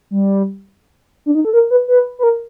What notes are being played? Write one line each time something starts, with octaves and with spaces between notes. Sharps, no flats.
G3
D4
D#4
A4
A#4
B4
B4
B4
A#4